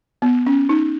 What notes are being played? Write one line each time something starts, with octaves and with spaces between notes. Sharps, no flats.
B3
C#4
D#4